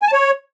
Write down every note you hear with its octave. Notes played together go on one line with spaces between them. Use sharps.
G#5
A5
C#5